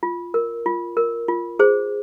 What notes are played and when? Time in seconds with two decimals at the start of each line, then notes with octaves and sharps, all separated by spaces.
0.03 F4
0.34 A#4
0.66 F4
0.97 A#4
1.28 F4
1.59 G#4 C5